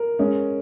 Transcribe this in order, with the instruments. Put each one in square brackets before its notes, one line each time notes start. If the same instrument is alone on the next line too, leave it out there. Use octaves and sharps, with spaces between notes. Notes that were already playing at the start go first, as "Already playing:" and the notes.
Already playing: [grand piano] A#4
[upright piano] G#3 [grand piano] C#4